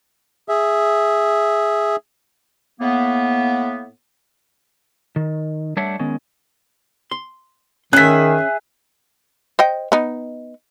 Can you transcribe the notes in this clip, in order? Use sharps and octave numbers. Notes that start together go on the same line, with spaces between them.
G#4 E5
A2 A#3 B3
D#3
G3 A3 D4 C#5 E5 F#5
D#3 G#3 B3 C#4
C6
D#3 C#4 G#4 E5 F#6 B6
C5 D#5 G5
B3 D#4